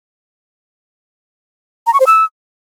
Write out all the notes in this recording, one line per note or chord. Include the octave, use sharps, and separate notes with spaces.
A#5
C#6
C5
E6